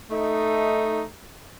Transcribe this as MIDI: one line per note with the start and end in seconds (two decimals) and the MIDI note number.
0.10 1.02 57
0.10 1.02 63